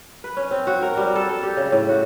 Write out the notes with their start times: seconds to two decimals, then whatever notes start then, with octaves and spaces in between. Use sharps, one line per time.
0.24 B4
0.37 C#4
0.51 C4
0.67 F#4
0.82 A#4
0.97 G3
1.15 A4
1.29 A4
1.43 G4
1.57 C#3
1.72 A2
1.89 F#4